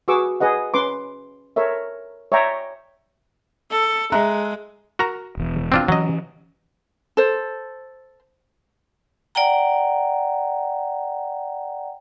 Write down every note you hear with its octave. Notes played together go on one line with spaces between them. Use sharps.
F#4 G#4 B4 C#6 D6 E6
G#4 B4 D#5 F#5
C#4 B4 C6 D6
A4 A#4 C#5 E5
C#5 D5 E5 G5 A#5
A4
G#3 E5 A#5 F#6
F#4 A#4 A#5
E1 E2
C4 D4 F4
E3 F#3 C#4 D#5
A4 C5
D5 F#5 G5 A#5